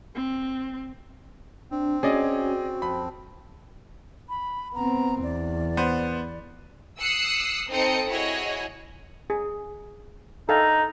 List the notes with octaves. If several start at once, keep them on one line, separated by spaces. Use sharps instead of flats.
C4
C4 D4
C#4 F#4 G#4 D5 D#5
F2 B5
B5
B3 C4 A#5
E2 D5
B3 C5
D#6 E6 F#6 C7 C#7
C4 D#4 A4 C5 D#6 C#7
E4 F#4 G#4 C#5 D#5
G#4
D#4 A4 F5 G5